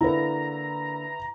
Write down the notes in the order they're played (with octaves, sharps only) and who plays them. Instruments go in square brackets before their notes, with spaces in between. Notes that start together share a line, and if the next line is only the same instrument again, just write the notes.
[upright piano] D3 A#3 [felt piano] E4 B4 [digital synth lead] A#5